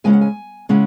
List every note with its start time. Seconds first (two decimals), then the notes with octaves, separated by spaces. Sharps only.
0.04 C#3 G#3 C#4 E4 G#5
0.13 F#5
0.21 G#5
0.69 C#3 G#3 C#4 E4 F#5